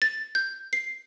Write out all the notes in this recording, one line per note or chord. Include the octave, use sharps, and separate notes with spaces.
A6
G6
C7